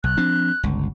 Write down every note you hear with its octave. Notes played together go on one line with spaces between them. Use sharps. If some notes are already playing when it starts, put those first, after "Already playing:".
B1 F#6
F3 C4 D4
G1 C#2